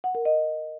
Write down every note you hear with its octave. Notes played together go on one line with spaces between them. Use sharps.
F#5
A#4
D#5